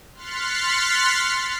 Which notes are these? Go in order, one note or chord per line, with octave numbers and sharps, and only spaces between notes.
C6 F6 F#6 A6 B6 C#7